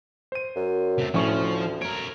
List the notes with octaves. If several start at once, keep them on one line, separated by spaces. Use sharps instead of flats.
C5 D#7
F#2
C3 A3
D2 A2 F3 C#4 C#6
A#4 C#5 D7